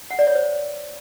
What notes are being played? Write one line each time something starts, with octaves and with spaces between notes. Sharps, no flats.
F#5
D5
C#5
C5